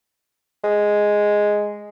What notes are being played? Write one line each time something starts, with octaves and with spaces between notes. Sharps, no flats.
G#3